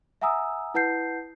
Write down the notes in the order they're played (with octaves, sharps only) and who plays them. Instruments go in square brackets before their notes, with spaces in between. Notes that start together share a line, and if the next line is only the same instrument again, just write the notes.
[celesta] E5 F#5 G#5 A#5 D#6 E6
E4 B4 F#5 A5 G6 C7